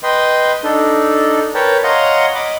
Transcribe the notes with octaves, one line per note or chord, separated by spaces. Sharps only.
B4 D#5 G5 C6
D4 D#4 A4
A#4 B4 C#5 G5 A5
C#5 D#5 F5 F#5 A#5 C6
D#5 B5 D6